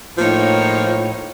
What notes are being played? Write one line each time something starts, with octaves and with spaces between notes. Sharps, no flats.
A2 F3 A#3 D#4 C#5